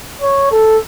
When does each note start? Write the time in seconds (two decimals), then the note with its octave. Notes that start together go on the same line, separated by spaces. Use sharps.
0.22 C#5
0.51 A4